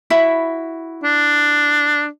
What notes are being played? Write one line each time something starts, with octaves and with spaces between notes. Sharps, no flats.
E4 F#4 B5
D4